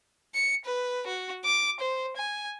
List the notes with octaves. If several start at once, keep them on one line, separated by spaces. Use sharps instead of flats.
C#7
B4
F#4
D6
C5
G#5